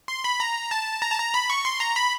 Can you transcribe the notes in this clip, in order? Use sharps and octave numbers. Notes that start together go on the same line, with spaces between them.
C6
B5
A#5
A5
A#5
A5
A#5
B5
C#6
C6
A#5
B5